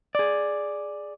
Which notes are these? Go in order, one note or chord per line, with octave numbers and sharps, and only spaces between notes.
G#4 D5